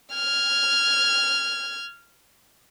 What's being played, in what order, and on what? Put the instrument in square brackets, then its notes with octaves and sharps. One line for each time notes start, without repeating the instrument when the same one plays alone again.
[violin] F6 G#6